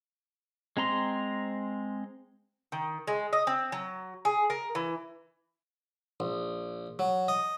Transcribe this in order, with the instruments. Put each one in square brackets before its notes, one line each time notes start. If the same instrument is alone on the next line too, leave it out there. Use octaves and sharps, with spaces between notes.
[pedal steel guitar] G#3 C4 A#5 C6
[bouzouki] D#3
G#3
D#5
C4
F#3
G#4
A#4
E3
[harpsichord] A#1
F#3
D#5